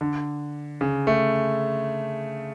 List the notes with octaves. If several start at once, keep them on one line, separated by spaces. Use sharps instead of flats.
D3
C#3
A3